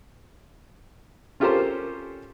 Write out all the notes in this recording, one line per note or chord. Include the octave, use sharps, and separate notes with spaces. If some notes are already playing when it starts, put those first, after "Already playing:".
C#4 F4 G4 A4 A#4 C5